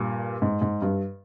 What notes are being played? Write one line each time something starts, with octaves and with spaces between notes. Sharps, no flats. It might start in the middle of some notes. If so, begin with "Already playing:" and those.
Already playing: G2 A#2
G#2
G#2
G2